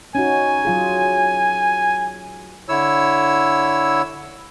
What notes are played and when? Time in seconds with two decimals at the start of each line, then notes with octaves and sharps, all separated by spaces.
0.15 C#4 D#4 F#4 G#5
0.65 F#3 F4 G#4
2.69 D3 E4 C#5 E6